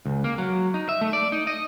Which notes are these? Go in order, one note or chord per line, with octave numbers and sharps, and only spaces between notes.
C#2
A#3
F#3
D#4
E5
A3
D5
D#4
D#5